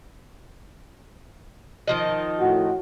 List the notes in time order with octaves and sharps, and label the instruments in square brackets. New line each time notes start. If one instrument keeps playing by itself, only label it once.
[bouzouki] D#3 F3 D#5
[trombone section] A2 F#4